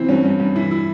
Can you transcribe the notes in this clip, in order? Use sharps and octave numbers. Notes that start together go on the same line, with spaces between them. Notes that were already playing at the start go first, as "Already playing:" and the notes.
Already playing: E3 C4
G2 C#4
G2
G2
E3 E4
E4